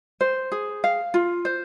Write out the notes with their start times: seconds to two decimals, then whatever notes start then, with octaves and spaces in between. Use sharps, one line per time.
0.21 C5
0.52 G#4
0.84 F5
1.14 F4
1.45 C5